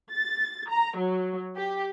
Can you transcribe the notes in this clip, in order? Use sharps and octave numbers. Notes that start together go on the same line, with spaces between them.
A6
A#5
F#3
G4